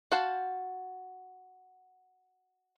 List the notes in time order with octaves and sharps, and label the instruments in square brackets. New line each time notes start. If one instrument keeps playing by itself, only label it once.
[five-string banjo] F#4 C5 F5 F#5 A5